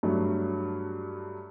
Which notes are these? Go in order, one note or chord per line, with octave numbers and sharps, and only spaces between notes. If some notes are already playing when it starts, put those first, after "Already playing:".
G2 F#3 A3